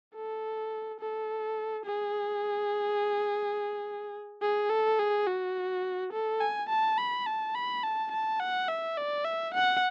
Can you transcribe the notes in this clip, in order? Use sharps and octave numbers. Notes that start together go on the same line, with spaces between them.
A4
A4
G#4
G#4
A4
G#4
F#4
A4
G#5
A5
B5
A5
B5
A5
A5
F#5
E5
D5
E5
F#5